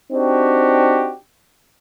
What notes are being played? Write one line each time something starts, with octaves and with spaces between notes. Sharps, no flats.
C4 D4 D#4 F#4 G4